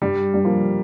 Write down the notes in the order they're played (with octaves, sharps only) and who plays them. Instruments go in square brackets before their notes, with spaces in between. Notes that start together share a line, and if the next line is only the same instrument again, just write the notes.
[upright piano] G2 [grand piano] G3
[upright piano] G2
[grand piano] F3 A#3